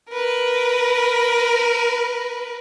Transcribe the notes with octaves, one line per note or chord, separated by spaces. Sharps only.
A#4 B4